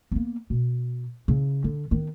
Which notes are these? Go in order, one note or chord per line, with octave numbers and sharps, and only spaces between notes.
A#3 B3
B2
C#3 E4
D3
D#3 B3